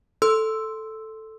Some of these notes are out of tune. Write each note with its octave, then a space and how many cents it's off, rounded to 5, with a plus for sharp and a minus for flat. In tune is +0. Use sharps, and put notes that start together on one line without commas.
A4 +0 C6 +0 E6 +0